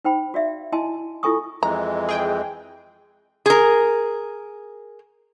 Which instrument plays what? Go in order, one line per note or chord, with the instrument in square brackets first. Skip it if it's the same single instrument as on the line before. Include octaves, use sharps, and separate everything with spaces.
[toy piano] D#4 C5 G5 B5
F#4 D5 E5 F5
E4 D#5 G#5 A5 C6
E4 F4 A4 G#5 C#6 D#6
[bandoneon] F2 E3 G#3 [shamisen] A#5
[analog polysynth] G#4 G5
[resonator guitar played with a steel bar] G#4 A#4